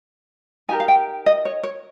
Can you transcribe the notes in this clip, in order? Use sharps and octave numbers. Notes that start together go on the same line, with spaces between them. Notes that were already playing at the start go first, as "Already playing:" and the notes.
D#4 G4 A#4 G#5
F5
G5
D#5
C#5
C#5